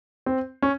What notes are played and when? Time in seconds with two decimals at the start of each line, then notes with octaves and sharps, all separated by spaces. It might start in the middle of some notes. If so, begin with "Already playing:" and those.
0.26 C4
0.62 C#4